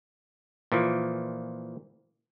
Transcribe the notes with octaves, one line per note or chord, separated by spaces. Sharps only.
A#2 E3 F3